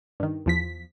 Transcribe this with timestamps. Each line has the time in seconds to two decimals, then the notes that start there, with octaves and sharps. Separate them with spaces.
0.20 G2 D#3
0.46 E2 F3 B6